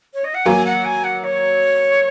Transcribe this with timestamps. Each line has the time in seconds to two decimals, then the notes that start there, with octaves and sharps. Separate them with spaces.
0.14 C#5
0.24 D#5
0.34 F#5
0.45 F#3 A#3 G#5
0.65 F#5
0.85 G#5
1.04 F#5
1.24 C#5